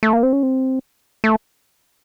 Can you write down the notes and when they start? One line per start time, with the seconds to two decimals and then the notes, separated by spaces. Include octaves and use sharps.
0.03 A3
0.13 A#3
0.23 C4
0.33 C#4
0.43 C4
1.24 A3